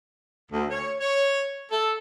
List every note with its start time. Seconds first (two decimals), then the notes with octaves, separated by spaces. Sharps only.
0.52 D2
0.71 C#5
1.00 C#5
1.72 A4